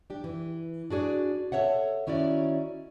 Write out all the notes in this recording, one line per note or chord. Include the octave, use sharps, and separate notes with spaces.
D4 G4
E3
D4 F#4 G#4 D5
A4 A#4 C#5 E5 F#5
D#3 C#4 E4 F#4 D5